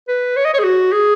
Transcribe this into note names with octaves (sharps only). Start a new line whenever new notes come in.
B4
C#5
D#5
C#5
G#4
F#4
G#4